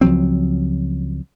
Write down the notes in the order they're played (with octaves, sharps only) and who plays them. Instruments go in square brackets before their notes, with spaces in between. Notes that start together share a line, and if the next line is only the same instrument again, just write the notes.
[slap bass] C#2 F3 F#3 C4